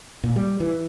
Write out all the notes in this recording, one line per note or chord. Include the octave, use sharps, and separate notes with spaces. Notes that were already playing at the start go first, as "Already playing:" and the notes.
A#2
G3
E3